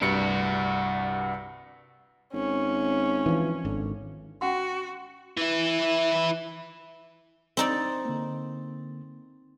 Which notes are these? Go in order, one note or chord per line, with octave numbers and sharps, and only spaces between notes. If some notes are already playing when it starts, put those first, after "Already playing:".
C2 G2 D4 F#4 C#7
G#1 C#4
E3 F3
G#1 D3
C#4 F#4 F#5 C6
E3 E4
C4 D#4 D5
D3 A#3